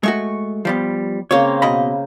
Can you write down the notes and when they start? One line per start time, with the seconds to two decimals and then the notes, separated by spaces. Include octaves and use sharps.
0.03 G#3 A3 F#4 C#6
0.65 F3 G3 B3
1.31 C#3 A#3 C4 C#5
1.62 B2 D#5 B5